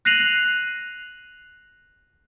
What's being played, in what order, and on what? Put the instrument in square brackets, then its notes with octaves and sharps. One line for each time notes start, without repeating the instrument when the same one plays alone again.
[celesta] F#6 A#6 C7 D#7 F7 F#7